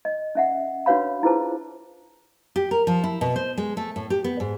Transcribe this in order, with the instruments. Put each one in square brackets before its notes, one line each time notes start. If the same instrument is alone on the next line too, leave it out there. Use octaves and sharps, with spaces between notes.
[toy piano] D#5
C#4 E5 F#5
D4 F#4 B4 C#5 F5 B5
E4 F4 G#4 B4 C5 A5
[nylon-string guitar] G4
A#4
F3
E4
B2
C5
G#3
A3
A2
G4
B3
G#2